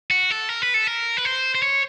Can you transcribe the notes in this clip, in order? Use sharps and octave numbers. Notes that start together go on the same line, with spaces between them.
F#4
A4
A#4
B4
A4
A#4
B4
C5
C5
C#5